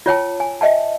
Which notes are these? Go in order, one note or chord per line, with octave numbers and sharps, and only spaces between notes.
F4 C#5 G5 A5
G#5
D#5 E5 G5 A5